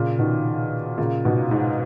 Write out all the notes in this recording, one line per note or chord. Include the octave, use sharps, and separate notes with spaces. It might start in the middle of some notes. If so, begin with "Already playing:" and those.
Already playing: A#2 C#3
B2 D#3
A#2 C#3
G#2 B2
G#2